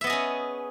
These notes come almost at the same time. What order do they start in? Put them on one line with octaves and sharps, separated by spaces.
E5 B3 D#5 G#4 C#4